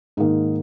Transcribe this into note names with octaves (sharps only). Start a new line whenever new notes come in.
G#2 D#3 A#3 D#4